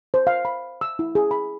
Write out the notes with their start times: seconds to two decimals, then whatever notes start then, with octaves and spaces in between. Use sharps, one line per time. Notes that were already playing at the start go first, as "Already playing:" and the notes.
0.14 C5
0.27 F5
0.45 B5
0.81 E6
0.99 E4
1.15 G#4
1.31 B5